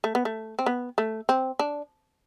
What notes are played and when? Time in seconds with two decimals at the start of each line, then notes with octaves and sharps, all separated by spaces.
0.04 A3
0.15 B3
0.25 A3
0.59 C4
0.66 B3
0.98 A3
1.29 C4
1.59 D4